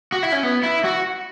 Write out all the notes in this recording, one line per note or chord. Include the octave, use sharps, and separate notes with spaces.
F#4
E4
C#4
B3
E4
F#4